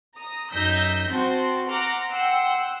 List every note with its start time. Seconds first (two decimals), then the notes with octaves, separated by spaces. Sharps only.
0.15 A#5 D#6
0.51 F#2 D#4 E6 G6 A#6 B6
1.10 C4 F#4 A5 C6
1.69 F#5 A#5 C6 D6 F6
2.11 F#5 G5 C6 E6